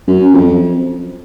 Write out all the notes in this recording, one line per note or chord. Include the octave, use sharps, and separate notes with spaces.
F#2
F2